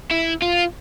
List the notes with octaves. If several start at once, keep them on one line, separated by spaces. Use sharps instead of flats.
E4
F4